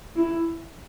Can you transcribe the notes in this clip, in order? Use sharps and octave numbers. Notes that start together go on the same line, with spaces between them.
E4